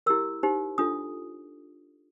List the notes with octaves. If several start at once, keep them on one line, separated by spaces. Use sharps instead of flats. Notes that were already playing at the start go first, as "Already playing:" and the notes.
E4 G4 A#4 E6
D#4 G4 C5
D4 F4 A4 D#6